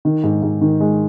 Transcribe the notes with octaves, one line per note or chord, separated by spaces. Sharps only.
D#3
G#2
G#2
D#3
G#3